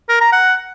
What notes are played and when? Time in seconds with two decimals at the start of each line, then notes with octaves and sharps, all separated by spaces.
0.09 A#4
0.21 A#5
0.32 F#5